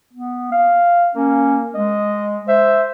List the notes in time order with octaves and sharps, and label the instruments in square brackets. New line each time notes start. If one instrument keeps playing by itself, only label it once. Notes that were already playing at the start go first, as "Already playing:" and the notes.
[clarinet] B3
F5
[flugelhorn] A#3 [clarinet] C#4
[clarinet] G#3 [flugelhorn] D#5
[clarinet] C5 [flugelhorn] E5